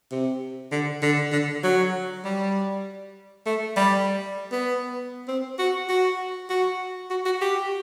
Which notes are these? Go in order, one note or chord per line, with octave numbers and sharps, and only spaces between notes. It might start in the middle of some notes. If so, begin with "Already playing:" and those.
C3
D3
D3
D3
F#3
G3
A3
G3
B3
C4
F#4
F#4
F#4
F#4
F#4
G4